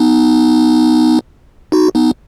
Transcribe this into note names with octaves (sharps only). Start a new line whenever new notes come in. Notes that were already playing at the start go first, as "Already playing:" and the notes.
Already playing: B3 D#4
D#4 F#4
B3 D#4